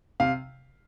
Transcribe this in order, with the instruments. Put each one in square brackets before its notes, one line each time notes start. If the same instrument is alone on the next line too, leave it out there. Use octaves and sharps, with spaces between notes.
[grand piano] C3 F5